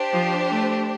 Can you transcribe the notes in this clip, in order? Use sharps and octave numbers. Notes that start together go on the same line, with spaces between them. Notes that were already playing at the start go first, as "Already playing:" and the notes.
Already playing: D4 G4 C5
F3
A3